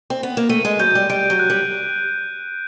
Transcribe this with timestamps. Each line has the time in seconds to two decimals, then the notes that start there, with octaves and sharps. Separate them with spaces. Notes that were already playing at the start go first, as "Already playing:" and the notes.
0.10 C4
0.23 B3
0.37 A#3
0.49 A3 D#7
0.65 G#3
0.79 F#3 G6
0.95 G3
1.10 G3 D7
1.30 F#3
1.39 F#6
1.50 G3